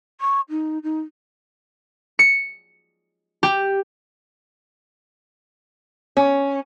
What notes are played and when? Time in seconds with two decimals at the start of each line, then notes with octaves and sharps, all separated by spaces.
0.21 C#6
0.50 D#4
0.83 D#4
2.19 C#7
3.43 G4
6.17 C#4